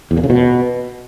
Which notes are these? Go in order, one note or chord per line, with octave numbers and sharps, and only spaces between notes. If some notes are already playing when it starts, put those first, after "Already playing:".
E2
A#2
C#3
B2